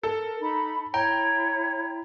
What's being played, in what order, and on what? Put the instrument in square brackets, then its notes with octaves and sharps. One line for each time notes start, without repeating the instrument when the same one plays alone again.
[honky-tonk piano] A4 [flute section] A#4
[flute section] D#4 B5
[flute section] E4 [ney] C#5 [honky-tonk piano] G5 [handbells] A#5